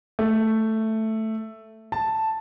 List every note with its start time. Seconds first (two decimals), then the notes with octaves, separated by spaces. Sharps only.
0.19 A3
1.92 A5